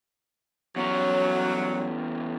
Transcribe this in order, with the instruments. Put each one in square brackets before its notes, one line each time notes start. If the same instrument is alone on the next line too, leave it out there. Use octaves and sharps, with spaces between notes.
[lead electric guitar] E2 C#4 [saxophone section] F#3